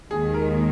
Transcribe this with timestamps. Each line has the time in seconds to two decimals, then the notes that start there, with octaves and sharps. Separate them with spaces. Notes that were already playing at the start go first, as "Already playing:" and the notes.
0.10 D#2 D#3 G#3 G#4
0.34 A#4